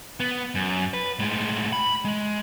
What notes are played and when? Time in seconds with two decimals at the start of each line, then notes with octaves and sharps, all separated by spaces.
0.20 B3
0.55 F#2
0.94 B4
1.19 A2 G#3
1.73 B5
2.05 G#3